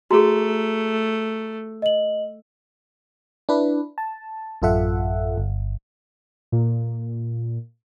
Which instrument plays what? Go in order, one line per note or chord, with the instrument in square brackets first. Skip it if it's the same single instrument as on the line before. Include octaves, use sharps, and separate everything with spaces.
[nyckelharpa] A3 [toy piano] F#4 G#4 [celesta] A#5
[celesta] D#5 F#7
[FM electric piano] D4 E4 B4
A5
A1 F#2 F4 A4 E5 F#5
G1
[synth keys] A#2